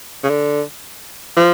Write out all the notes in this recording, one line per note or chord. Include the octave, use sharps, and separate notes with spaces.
C#3
D3
F3